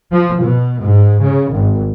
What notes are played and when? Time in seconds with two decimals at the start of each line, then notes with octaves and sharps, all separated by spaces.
0.12 F3
0.42 B2
0.82 G#2
1.21 C#3
1.52 G#1